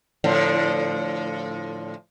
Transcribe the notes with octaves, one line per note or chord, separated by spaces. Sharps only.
A2 D3 F3